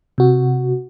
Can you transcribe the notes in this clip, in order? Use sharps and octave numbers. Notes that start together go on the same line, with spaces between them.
C3 F#4